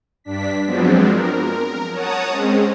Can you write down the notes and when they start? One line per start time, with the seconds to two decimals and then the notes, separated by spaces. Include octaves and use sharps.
0.24 G2 D4 B6
0.66 F3 F#3 G#3 B3 C4 D4
1.08 A#4
1.90 C#5 F#5 A5 A#5 D#6
2.29 G#3 C4 C#4